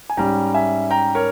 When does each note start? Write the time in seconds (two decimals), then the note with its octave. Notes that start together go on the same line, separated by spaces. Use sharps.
0.10 G#5
0.17 G#2 G3 C#4 G5 A#5
0.54 E5 G#5
0.90 G5 A#5
1.15 A#4 C#5